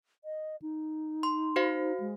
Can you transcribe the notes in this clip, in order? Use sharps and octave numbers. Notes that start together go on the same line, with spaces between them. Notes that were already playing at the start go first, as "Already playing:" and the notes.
D#5
D#4
C6
F#4 C5 F5
G#3